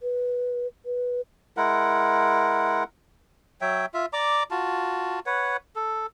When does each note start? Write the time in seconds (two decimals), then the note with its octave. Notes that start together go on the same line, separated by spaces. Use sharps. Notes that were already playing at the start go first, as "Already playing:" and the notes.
0.01 B4
0.86 B4
1.57 G#3 E4 A#4 F#5
3.61 F#3 C#5 E5 G5
3.94 F4 E5
4.13 D5 A#5 D6
4.51 F4 F#4 A5
5.26 B4 C#5 F#5
5.76 A4